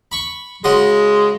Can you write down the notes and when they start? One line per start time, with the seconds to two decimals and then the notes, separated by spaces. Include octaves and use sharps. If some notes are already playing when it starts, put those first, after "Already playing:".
0.12 B5 C#6
0.64 C#3 G#3 F#4 C6